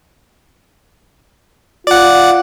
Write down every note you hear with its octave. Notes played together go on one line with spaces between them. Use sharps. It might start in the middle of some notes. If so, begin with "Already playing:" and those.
F4 D5 F#5